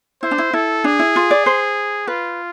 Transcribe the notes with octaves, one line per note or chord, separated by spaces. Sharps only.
E4 C5
D4
E4
E4 A4
D4 G#4
E4
F4
D5
C5
F4 B4